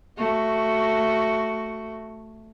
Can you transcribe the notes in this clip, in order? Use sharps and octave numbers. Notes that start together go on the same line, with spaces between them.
A3 F#4